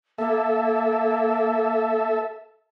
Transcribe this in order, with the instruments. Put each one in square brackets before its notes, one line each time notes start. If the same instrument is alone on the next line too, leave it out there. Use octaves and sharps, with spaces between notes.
[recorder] A#3 [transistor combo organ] A4 E5